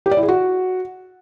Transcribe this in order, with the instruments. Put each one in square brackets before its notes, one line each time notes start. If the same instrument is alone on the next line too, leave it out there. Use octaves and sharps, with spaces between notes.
[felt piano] G4
D5
E4
G#4
F#4